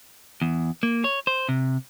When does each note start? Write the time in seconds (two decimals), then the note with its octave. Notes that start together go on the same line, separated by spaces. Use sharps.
0.42 E2
0.83 A#3
1.04 C#5
1.27 C5
1.49 C3